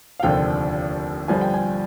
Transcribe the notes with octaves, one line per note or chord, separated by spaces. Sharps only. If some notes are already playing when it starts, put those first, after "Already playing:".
F5
F1 D#2 D3 F3 G5
G1 G2 D3 F3 G#5
G5
G#5